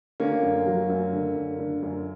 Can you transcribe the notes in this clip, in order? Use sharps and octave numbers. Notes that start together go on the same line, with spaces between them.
D3 A#3 C#4
F#2
F#3
F#2
D3
F#2
D3
F#2